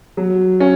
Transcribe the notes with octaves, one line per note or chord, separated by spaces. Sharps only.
F#3
C#4